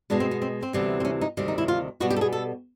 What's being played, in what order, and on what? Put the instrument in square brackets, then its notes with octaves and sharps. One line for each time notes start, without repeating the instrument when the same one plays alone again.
[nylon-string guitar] B2 G#3 B3 D4
C4
B3
C4
C4
D2 C3 E3 G3 B3
C4
C#4
D#4
D2 C3 D#3 G3
D#4
E4
F4
B2 G3 B3 F#4
G4
A4
G#4
A4